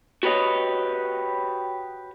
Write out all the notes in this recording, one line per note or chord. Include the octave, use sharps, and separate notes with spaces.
F#4 G4 B4 C#5 D#5